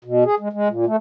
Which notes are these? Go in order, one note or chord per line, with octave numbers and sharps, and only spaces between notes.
B2
G#4
G#3
G#3
A#2
A3